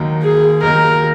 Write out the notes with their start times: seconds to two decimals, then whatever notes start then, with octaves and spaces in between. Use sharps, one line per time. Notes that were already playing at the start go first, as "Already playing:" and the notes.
Already playing: D#2 D#3 F#3 A#3 D#4
0.23 G#4
0.62 D#2 D#3 F#3 A#3 D#4 A#4